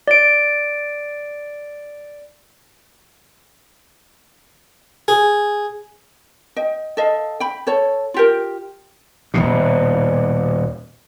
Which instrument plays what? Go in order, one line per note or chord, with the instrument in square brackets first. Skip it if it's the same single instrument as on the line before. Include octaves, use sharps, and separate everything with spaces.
[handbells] D5 D7
[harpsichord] G#4
[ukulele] D#5 G5
A4 D#5 F5
G5 B5
A4 C#5
F4 G4 A#4
[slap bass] D#1 G#1 B2